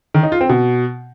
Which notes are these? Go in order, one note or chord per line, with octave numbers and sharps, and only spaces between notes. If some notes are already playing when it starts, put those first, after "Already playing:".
D#3
D#4
F4
C4
B2